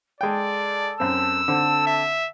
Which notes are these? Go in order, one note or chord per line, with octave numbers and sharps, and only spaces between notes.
G#3 A4 D5 G5
F#2 C4 E6
D3 C4 A4
E5